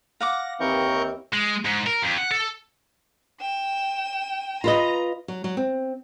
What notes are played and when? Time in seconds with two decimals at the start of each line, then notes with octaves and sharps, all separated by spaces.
0.21 F5 F#5 D6 A#6
0.60 D#2 E3 C4 A#4 C#6 G6
1.34 G#3
1.65 G#2
1.87 A#4
2.03 F2
2.18 F#5
2.31 A4
3.41 G5 E7
4.64 F4 B4 D#5 A#5
5.28 F#3
5.44 F#3
5.57 C4